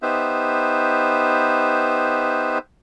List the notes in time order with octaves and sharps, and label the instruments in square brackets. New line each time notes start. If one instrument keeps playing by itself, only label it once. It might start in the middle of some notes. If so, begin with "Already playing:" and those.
[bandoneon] B3 D#4 G4 B4 C5 E5